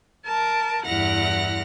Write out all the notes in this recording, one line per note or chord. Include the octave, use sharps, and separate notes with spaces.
A#4 A5
E2 G2 E4 F#5 F6 A#6